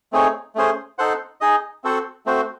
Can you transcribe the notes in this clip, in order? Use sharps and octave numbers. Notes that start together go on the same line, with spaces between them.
A3 C4 D#4 G#4 C#5
A3 C#4 G#4 C5
D#4 A4 C5 F#5
D#4 G#4 D#5
C4 F#4 A4 C5 F#5
A3 C4 F#4 C5